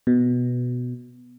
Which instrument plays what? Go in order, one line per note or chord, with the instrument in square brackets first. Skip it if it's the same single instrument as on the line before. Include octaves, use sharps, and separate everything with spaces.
[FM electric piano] B2